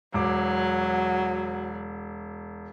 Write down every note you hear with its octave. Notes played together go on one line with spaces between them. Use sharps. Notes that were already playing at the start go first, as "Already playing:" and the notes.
E1 F#3 D6